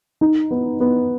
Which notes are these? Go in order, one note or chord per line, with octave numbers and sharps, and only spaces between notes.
D#4
B3
B3